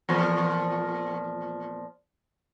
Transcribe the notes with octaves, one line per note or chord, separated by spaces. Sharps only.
E2 A#2 F3